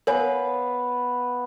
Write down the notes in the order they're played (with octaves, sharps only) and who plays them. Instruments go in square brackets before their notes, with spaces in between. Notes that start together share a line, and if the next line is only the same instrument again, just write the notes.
[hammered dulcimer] B3 B4 F5 [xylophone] A#4 C#5 G#5